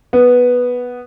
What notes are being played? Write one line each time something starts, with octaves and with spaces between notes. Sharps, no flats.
B3